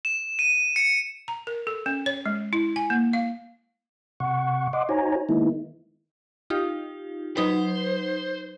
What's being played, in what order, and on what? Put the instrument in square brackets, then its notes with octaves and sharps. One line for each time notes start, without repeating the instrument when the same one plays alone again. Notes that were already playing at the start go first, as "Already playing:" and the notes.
[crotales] E7
D#7
C#7
[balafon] A#5
A#4
A4
C#4
C#5
G#3
E4
G#5
A#3
F5
[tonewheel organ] C3 F#5 C#6
D#5 F#5 C6 D6
D#4 F#4 C5 C#5 G#5 A#5
D#3 G#3 A#3 B3 D#4 E4
[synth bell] D#4 F4 G4
[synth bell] F#3 D#4 B4 [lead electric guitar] C5